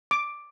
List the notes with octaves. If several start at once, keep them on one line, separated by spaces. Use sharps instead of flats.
D6